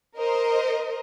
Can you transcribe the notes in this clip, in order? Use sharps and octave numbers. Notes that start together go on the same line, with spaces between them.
A#4 C5 D#5